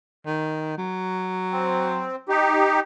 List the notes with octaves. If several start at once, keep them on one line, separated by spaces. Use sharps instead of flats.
D#3
F#3
C4
D#4 G4